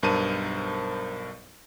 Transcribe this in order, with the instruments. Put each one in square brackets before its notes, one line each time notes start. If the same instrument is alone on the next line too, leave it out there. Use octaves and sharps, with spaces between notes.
[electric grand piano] B1 G2 A#4 C5 A5 D#7